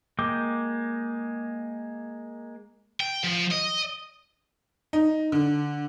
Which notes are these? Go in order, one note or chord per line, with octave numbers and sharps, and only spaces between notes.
G#3 A#3 G5 D6
G5
F3
D#5
D#4
D3